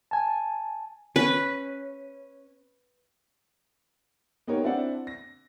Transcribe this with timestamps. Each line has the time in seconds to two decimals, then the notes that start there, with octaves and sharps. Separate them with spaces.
0.11 G#5 A5
1.16 C#4 B4
4.47 B3 D#4 G4 A#4 C#5
4.64 C4 D4 E4 D5 E5 F#5
5.07 A#6